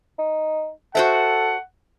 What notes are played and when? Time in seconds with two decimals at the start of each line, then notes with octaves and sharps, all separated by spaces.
0.19 D#4
0.95 F#4 A4 C5 E5 F#5